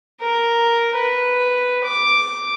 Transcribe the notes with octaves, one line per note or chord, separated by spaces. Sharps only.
A#4
B4
D6